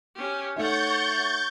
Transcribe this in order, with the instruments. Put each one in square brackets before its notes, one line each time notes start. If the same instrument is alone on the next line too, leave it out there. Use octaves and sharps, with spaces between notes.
[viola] C#4 G4
[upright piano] A3 D#4 E5 [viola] C#5 F#5 [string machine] C#6 G6 A6